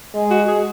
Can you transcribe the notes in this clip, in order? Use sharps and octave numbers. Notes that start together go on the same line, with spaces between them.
G#3
F#4
G#4